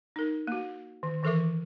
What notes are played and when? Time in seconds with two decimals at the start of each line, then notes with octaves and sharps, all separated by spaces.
0.16 D#4 A#4
0.47 A#3 F#4
1.03 D#3
1.23 D#3 E3 A4 A#4 E5 D6